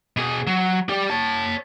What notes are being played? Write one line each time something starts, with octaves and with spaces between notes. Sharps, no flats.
B2 G#4
F#3
G4 D5
C#5 A5